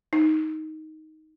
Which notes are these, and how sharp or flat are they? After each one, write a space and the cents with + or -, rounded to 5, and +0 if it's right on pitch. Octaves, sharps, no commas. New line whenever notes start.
D#4 +10